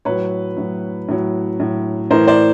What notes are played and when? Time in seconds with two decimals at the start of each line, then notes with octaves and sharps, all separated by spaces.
0.05 A2 F#3 B4 C#5
0.56 A2 F#3
1.08 A2 F#3
1.60 A2 F#3
2.10 A2 E3 A#4 C5
2.28 C5 D5